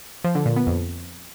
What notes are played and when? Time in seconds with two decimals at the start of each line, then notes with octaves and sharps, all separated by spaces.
0.24 F3
0.35 D3
0.46 A#2
0.56 B3
0.67 F2